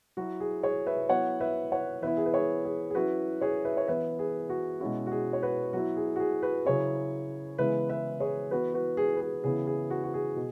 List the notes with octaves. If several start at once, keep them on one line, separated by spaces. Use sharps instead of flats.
F#3 E4 F#4
G#4
G#4 C#5
B4 E5
F#3 B3 E4 C#5 F#5
B4 E5
C#5 F#5
E3 B3 E4 B4 E5
G#4
B4
G#4 C#5
G#4
G#4
F#3 C#4 E4 F#4 B4
G#4 C#5
B4 E5
C#5
E3 B3 E4 B4 E5
G#4
F#4
B2 G#3 C#4 E4 F#4
F#4
G#4
C#5
F#4 B4
F#3 B3 E4 F#4
G#4
F#4
G#4
F#4 B4
C#3 F#3 C#4 E4 G#4 C#5
C#3 E3 G#3 B3 B4 E5
B4 E5
G#4 C#5
E3 B3 E4 F#4 B4
F#4 B4
G#4
B4
G#4
C#3 E3 B3 E4 G#4
G#4
F#4
F#4
G#4
B2